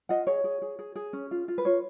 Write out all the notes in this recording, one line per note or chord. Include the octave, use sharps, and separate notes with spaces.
F4 D#5 F#5
G#4 C#5
G#4
G#4
G#4
G#4
C#4
F4
F4
B4
F4 C#5